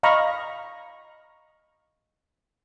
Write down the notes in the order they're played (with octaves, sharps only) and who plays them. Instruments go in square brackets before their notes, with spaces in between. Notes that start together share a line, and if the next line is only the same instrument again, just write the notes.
[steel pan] D#5 F5 A#5 B5 C#6